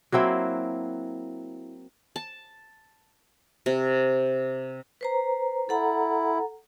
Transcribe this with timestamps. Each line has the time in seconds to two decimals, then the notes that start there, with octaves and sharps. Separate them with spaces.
0.12 F#3 A#3 C4 E4
2.16 A5
3.66 C3
5.01 B4 C5 A#5
5.69 E4 A4 F#5 A#5